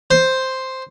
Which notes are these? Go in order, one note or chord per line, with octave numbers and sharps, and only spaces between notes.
C5